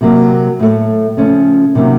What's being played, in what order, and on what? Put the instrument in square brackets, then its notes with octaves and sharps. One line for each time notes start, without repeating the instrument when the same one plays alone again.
[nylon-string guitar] C3 F#3 A#3
A2 A3
C#3 F3 A3 C#4
C3 D#3 F#3 A#3